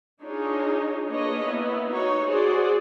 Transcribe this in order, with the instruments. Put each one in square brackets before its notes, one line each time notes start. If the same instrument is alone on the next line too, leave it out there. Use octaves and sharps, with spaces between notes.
[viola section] D4 D#4 F4 G#4 C#5
A#3 D4 G#4 B4 C#5 D#5
A#3 B3 E4
D#4 F#4 C#5
F#4 G#4 C5 D5